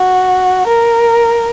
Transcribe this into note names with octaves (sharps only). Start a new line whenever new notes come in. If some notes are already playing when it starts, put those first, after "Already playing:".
Already playing: F#4
A#4